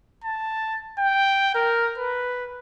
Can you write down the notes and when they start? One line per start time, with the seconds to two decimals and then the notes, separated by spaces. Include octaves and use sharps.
0.24 A5
0.99 G5
1.55 A#4
1.98 B4